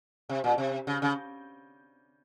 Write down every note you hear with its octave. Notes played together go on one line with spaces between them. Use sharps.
C3
A#2
C3
C#3
C#3